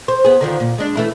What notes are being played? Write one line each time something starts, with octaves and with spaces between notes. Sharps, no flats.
C5
B3 G#4
D3 D#3 F3
A#2
G#3 D4
E3 A3 E4